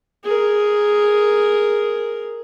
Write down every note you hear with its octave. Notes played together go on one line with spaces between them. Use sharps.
G#4 A#4